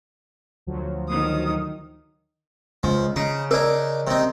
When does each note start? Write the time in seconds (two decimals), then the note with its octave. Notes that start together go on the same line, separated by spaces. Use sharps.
0.67 D2 F3 F#3
1.08 D#3 D#6
2.83 C#2 F3
3.16 C#3 D#4
3.51 D4 D#4 A#4 D5
4.07 C3 D#4